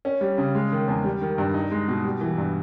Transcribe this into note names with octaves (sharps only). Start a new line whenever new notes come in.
C#4
G3
C#3
G#3
D#3
E2
G3
D#3
G2
D#4
G#3
B2
G3
E3
G2